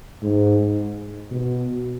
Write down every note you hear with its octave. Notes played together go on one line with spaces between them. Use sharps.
G#2
B2